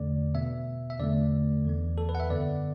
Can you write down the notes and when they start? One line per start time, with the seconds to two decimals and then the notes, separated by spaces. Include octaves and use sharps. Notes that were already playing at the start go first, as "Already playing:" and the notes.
Already playing: E2 D3 A3 D5
0.34 B2 B3 E5
0.90 E5
1.00 E2 D3 A3 D5
1.65 E2 E3 B3
1.98 A4
2.09 B4
2.15 F#5
2.20 E5
2.30 F#2 D3 B3 D5